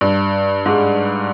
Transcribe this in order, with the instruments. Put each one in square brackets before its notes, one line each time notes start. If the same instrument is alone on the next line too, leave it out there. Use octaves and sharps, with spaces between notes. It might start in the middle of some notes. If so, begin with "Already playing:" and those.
[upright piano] G2
G#2